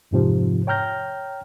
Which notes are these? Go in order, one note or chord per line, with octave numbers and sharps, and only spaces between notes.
F2 G#2 C3 F3
C#5 G5 A#5 F6 G6 A#6